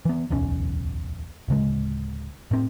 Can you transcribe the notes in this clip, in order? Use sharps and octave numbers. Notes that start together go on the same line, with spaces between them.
E3 B3
D1 B1 E2 C#4
D1 C#3 G#3
A2 C4